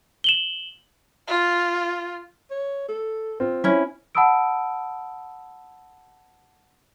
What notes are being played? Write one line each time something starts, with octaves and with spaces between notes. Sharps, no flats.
E7 F#7 G7
F4
C#5
A4
C4 F4
C#4 E4
F#5 A5 B5 D#6 E6 D7